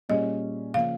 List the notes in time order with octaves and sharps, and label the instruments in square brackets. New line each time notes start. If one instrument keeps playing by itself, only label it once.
[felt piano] A#2 G3 C#4 G#4 [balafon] D#5
[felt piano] C#3 F3 A#3 [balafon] F5